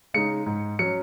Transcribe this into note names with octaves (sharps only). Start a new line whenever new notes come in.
C#3 G#3 D#4 C#7
G#2
F#3 C#4 C#7